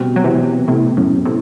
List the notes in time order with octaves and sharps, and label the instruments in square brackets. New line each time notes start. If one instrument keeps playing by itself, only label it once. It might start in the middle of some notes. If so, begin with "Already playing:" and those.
Already playing: [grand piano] B2 G3 C4 F#4
[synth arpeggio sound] F#3
C3 E3
A2 C3
F#2 A2
A2 C3